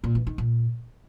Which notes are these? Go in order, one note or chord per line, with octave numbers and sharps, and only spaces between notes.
A#2
E3
D#3
A#2